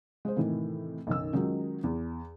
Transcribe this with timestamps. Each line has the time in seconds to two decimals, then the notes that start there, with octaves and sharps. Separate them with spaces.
0.25 G#3 C5
0.36 A2 C3 D#3 E3
1.07 B1 F#2 D#3 E6
1.33 D#3 F#3 G#3 C#4 D#4 F4
1.83 E2